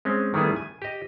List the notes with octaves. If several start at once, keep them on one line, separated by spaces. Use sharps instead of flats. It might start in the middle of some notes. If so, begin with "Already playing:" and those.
G#3 C4 C#4
D#3 G3 A3 B3 E4 G#4
G#5
G4 D#5